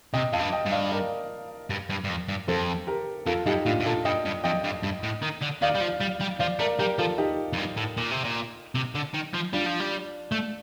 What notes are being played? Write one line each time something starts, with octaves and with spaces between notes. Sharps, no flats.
C3 D#5 G5
F2 F5 A5
G2
D#5 G5
G2
D5 F5
A#4 D5
G2
G2
G2
F2
G2
F2 A4 C5
G4 A#4
F2 F4 A4
G2 D#4 G4
A2 D4 F4
A2
A#2 F4 A4
G2 D#5 G5
G2
F2 D#5 G5
G2
G2
A2
D#3
D3
D#3 D5 F5
G3
F3
G3
G3
F3 D5 F5
A3 A#4 D5
G3 G4 A#4
F3 F4 A4
D#4 G4
F2
G2
A2
A#2
C3
A#2
C3
D3
D#3
F3
G3 D4 F4
F3
G3
A3